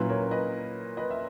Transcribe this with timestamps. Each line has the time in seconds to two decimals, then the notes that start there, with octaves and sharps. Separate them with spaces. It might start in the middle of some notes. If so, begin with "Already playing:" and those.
Already playing: A#2 F#3 C#4 E4 B4
0.09 A#4 C#5
0.31 B4 D#5
0.97 B4 D#5
1.10 E5